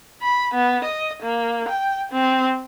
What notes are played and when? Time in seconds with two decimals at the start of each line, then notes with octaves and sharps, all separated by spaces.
0.22 B5
0.54 B3
0.84 D#5
1.22 A#3
1.68 G5
2.12 C4